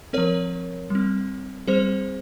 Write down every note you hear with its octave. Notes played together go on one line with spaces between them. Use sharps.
F3 C4 A#4 C#5
G3 C4
G3 C4 G#4 C5